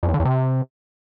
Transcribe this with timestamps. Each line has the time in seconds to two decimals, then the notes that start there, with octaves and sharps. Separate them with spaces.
0.03 F2
0.08 E2
0.14 D3
0.20 E2
0.25 C3